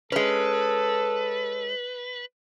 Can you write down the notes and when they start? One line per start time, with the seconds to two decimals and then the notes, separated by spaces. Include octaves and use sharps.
0.12 G#3 C#4 A4 B4